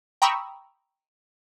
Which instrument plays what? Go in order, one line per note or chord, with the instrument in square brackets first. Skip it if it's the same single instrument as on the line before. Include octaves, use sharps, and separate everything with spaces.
[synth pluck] G5 A#5 B5 C#6 D#6 E6